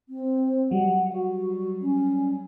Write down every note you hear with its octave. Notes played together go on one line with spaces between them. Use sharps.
C4
F#3 G3 F#5
F#4
C#4